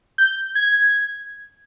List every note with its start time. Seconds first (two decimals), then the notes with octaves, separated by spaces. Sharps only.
0.18 G6
0.55 G#6